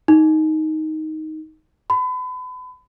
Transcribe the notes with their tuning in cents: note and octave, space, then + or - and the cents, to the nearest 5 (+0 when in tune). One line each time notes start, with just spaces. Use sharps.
D#4 +10
B5 +35